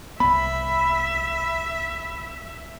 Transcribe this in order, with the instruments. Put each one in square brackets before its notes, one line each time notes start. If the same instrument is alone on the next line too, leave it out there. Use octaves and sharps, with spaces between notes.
[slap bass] C2 B3 [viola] E5 [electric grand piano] B5